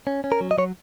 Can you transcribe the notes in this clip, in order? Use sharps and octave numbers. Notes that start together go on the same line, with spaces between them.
C#4
C#4
A#4
F#3
D#5
F#3 C#5